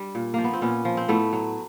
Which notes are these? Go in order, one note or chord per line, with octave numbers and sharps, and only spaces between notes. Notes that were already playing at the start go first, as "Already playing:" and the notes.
Already playing: G3 D4
A#2
F3 A#3
B3
C4
A#2 B3 C#4
F3
C4
A2 A3 B3
F#3